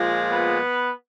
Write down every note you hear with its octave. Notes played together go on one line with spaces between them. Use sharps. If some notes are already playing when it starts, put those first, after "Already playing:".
Already playing: A#2 F3 G#3
B3 B4